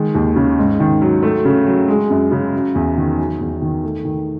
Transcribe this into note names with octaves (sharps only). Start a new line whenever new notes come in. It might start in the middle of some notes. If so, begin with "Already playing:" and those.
Already playing: D#3 G#3
D#2
C#3
G#2
D#3
F#3
A3
C#3
F#3
G#3
F#2
C#3
F#3
E2
D#3
F#3
E2
D#3
A3
D#3